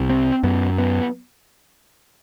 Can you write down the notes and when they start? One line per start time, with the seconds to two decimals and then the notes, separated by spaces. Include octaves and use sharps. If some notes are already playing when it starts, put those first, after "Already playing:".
Already playing: C2 C3
0.10 C4
0.44 F#2 B3
0.78 B3